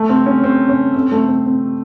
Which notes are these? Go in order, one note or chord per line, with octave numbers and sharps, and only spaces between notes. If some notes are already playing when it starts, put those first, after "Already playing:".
Already playing: A3
C4
C#4
C4
C#4
C4
A3
C4
C4